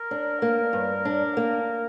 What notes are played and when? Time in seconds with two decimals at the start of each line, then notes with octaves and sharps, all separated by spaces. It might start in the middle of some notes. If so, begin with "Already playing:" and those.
Already playing: A#4
0.11 D4
0.42 A#3
0.73 G2
1.05 D4
1.37 A#3